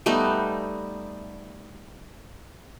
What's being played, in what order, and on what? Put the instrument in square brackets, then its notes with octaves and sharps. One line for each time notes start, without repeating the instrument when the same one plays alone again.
[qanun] G3 A3 B3 D#4